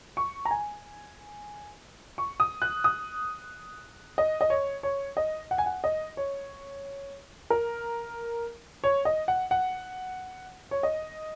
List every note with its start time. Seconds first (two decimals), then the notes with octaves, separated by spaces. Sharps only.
0.17 C#6
0.45 A#5
0.51 G#5
2.18 C#6
2.40 D#6
2.62 F#6
2.84 D#6
4.18 D#5
4.41 D#5
4.50 C#5
4.83 C#5
5.17 D#5
5.51 F#5
5.58 G#5
5.66 F#5
5.84 D#5
6.17 C#5
7.50 A#4
8.84 C#5
9.05 D#5
9.28 F#5
9.51 F#5
10.71 C#5
10.83 D#5